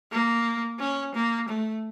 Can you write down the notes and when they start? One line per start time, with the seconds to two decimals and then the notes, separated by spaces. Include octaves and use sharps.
0.11 A#3
0.79 C#4
1.14 A#3
1.48 A3